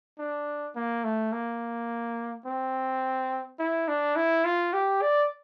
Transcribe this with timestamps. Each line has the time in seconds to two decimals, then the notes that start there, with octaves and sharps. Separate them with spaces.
0.19 D4
0.75 A#3
1.04 A3
1.32 A#3
2.46 C4
3.59 E4
3.88 D4
4.16 E4
4.45 F4
4.73 G4
5.02 D5